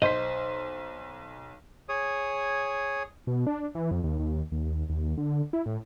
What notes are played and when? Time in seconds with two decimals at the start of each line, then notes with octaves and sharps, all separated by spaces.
0.02 B1 C5 D#5 C6 B6
1.89 G#4 C#5 D#6
3.27 B2
3.47 D4
3.75 E3
3.91 F2
4.04 D#2
4.19 D#2
4.52 D#2
4.66 D#2
4.89 D#2
5.17 D3
5.53 E4
5.66 A2